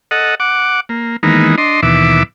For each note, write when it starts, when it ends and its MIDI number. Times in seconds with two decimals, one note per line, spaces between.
0.11 0.35 69
0.11 0.35 75
0.11 0.35 78
0.40 0.80 78
0.40 0.80 86
0.89 1.16 58
1.23 1.56 51
1.23 1.56 52
1.23 1.56 56
1.23 1.56 58
1.23 1.56 59
1.23 1.56 63
1.58 1.81 62
1.58 1.81 75
1.58 1.81 84
1.83 2.23 39
1.83 2.23 47
1.83 2.23 52
1.83 2.23 76
1.83 2.23 86